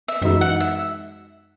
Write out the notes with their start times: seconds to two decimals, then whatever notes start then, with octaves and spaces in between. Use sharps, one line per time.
0.08 E5
0.22 F#2 E3 G#3 D#4 F#4 E5
0.41 F#5
0.60 E5